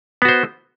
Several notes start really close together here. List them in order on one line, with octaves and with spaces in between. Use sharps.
B3 F#4 C5